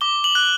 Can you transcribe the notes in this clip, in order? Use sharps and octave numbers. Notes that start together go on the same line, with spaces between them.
D6 G7
F#7
F#6